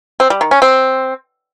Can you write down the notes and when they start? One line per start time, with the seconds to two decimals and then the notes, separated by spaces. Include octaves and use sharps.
0.20 C4
0.30 G3
0.41 D#3
0.51 C#4
0.62 C4